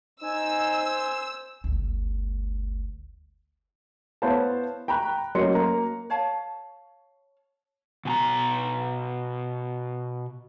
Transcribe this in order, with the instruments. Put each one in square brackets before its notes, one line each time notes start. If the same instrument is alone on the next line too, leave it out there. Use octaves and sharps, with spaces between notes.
[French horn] D#4 [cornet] C5 [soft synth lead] G#5 [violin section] E6
[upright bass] G1 D2
[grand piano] B3 E4 C5 C#5 F5 A5
G5 A#5 B5 C#6 F#6
F#3 A#3 C#4 D#5 C6 C#7
A#3 A#5
[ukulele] C#5 F5 A5
[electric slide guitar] B2 G#5 A#5